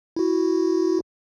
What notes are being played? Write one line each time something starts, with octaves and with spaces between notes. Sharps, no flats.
E4 F#4